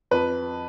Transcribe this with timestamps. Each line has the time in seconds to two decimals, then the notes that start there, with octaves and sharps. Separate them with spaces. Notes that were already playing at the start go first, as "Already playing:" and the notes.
0.11 F2 B4